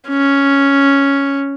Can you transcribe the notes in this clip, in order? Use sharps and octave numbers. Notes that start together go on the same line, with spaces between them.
C#4